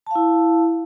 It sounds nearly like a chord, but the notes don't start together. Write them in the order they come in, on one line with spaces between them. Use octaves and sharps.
A5 F5 E4